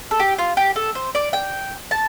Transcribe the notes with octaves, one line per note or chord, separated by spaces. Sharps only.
A4
G4
F4
G4
A4
C5
D5
G5
A5